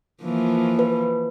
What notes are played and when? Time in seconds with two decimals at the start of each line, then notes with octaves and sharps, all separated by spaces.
0.23 E3 F3 A#3
0.79 B4